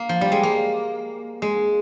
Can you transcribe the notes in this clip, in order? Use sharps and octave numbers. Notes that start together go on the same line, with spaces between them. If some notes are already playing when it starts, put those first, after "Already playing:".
Already playing: A#3
F3
G3
G#3
A#3
G#3